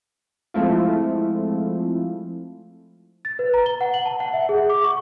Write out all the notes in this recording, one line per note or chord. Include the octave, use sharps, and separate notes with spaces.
F3 G#3 A3 C4 E4 F4
A6
B4
A#5
G7
F#5
F#7
A5
F#5
E5
G#4
D6
C#6